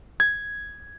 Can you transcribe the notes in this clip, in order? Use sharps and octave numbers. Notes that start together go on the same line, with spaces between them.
G#6